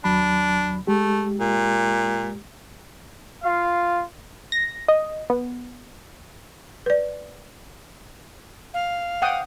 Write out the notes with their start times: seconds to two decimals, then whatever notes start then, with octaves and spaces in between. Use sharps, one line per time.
0.04 D#2 F#3 D4 B5
0.87 G#3 A3 G4
1.40 A#2
3.43 F4 F5
4.52 A#6
4.88 D#5
5.30 B3
6.86 B4 D5
8.74 F5
9.22 F#5 G5 D#6